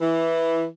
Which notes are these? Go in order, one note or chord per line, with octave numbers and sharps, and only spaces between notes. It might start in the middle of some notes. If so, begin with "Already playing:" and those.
E3